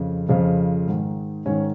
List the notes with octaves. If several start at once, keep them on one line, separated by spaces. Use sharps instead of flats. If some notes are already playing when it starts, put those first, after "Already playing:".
Already playing: F2 C#3
F2 C#3 F3
G#2 D#3
G#2 D#3 C#4